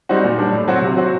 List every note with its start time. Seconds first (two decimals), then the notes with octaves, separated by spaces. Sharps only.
0.09 G3 C4 D#4 F#4
0.24 A#2
0.39 G3 D4
0.53 A2
0.68 F#3 C4 F#4
0.82 C3
0.97 F#3 C4 F#4